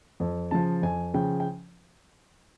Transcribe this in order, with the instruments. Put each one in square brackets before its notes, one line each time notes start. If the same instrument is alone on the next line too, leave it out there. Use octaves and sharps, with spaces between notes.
[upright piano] F2
C#3 F3 A5
F2 G#5
C#3 F3 G5
G5